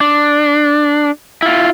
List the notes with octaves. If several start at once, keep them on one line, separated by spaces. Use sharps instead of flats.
D4
E4 F4